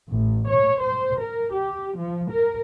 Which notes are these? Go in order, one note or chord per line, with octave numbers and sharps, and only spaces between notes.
A1
C#5
C5
A#4
G4
F3
A#4